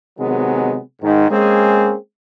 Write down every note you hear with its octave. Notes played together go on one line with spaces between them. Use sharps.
C3 D#3 F#3 G#3 B3 G#4
G#2 D#3
G#3 A#3 C4 C#4 G#4